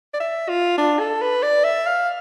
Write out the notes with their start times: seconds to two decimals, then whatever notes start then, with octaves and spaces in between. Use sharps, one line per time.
0.14 D5
0.20 E5
0.49 F4
0.78 D4
0.99 A4
1.21 B4
1.43 D5
1.64 E5
1.87 F5